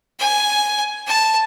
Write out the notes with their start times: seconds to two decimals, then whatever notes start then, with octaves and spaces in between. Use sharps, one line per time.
0.19 G#5
1.07 A5